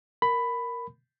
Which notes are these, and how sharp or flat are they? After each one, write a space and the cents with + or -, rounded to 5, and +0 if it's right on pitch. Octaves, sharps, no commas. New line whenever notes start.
A#4 +0 B5 +10